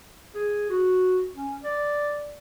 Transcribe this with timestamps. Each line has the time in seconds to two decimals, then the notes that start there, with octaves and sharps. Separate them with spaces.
0.35 G#4
0.70 F#4
1.36 C#4
1.64 D5